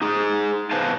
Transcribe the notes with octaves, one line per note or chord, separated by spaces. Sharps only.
D#4 G#4
B2 B4 C5 F5 G#5 A5